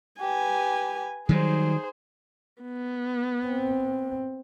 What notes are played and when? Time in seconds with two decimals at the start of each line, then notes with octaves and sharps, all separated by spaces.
0.21 G4 B4 G#5
1.29 D#3 F#3 G3 D#4 G#4 C5
2.62 B3
3.47 C4